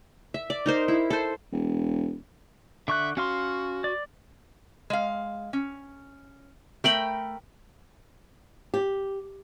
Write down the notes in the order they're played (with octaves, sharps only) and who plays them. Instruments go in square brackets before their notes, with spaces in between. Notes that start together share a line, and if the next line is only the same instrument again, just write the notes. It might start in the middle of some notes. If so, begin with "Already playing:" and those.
[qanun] E5
D5
D#4 A#4 C5
E4
A4 C5
[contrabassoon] E1
[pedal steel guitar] D3 C#6 F#6 [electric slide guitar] E5
[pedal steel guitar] C#4 F5 C6 [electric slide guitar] F#4
[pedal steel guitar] D5
[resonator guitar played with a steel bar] G#3 F5
C#4
[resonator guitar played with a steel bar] A3 [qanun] A#4 G5 B5
[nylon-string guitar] G4